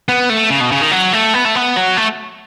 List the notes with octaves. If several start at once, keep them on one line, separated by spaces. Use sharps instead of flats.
B3
A3
C#3
B2
C#3
D#3
F#3
A3
B3
A3
B3
F#3
A3